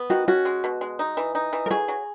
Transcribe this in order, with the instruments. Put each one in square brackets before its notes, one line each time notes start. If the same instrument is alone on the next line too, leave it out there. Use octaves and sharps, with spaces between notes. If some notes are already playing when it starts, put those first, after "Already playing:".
Already playing: [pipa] B3
[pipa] D#3 [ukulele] F#4
[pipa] C#4 [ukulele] F#4
[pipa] G#3
B2
G#3
D#4
E3
D#4
E3
[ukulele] A#4
[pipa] F#3 [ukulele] G#4
[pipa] F#3